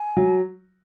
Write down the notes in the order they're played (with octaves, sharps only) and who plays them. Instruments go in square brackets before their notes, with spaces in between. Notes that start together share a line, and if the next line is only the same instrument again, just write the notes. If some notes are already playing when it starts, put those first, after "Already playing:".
Already playing: [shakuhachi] G#5
[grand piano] F#3